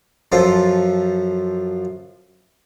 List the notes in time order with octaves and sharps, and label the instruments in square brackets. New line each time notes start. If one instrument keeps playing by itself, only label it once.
[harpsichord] F#2 F3 F4 A4